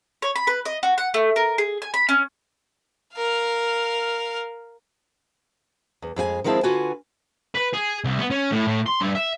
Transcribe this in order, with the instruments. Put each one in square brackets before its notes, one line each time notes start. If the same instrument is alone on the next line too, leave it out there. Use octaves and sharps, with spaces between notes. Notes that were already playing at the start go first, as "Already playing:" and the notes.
[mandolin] C#5
B5
B4
D#5
F#4
F#5
A3
A#4
G#4
G#5
B5
C#4
[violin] A#4 F5
[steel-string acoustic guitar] E2
F2 G#3 F4 G#5
D#3 F3 G#3 C4 E4 A5
D3 F4 F#4 B4 G#5
[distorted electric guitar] B4
G#4
C2
B3
C#4
A2
A2
C6
G2
E5